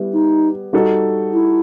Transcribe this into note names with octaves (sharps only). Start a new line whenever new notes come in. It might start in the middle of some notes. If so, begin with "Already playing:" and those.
Already playing: G3 B3 E4
D#4
G3 D#4 F#4 A4
E4